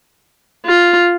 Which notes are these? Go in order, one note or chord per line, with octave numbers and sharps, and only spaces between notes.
F4